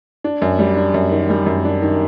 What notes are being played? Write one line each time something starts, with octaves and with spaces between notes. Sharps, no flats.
D4
F#2
G3
D4
F#2
D#3
G3
F#2
D4
D#3